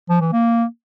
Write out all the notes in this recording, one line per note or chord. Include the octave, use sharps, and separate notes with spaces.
F3
E3
A#3